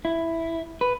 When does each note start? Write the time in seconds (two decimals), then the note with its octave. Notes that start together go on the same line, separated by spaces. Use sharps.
0.05 E4
0.81 B4